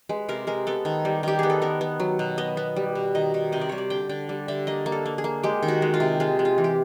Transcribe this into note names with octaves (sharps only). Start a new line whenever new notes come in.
G#3 B4
C3 A#4
G#3 A#4
B3 A4
D#3
G3
D#3 G4
B3 G#4
A4
B3 A#4
B3
F#3
B2
B3 D#5
B3
G3
B2
D#3 D#5
D#3
C3 D#5
D5
G3 C#5
D5
D3 G5
D3 G5
G3
D3 E5
A#3 D#5
A#3
A4
A#3
G#4
A#3
G#3 G4
D#3
F#4
G#3
F4
C3
G#3 F4
G#3
F4
E3
G4